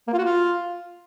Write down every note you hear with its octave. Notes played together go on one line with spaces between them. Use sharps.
A#3
F4
F#4
F4